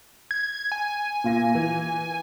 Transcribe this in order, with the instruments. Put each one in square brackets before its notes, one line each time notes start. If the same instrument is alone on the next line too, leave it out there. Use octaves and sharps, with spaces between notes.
[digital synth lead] G#6
G#5
[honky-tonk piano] A#2 F4 A#6
E3